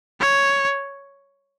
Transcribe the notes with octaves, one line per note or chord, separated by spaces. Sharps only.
C#5